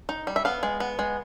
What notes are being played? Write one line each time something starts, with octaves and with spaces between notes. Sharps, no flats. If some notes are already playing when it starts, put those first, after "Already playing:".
D#4
G3
E5
B3 F5
G#3
B3
G#3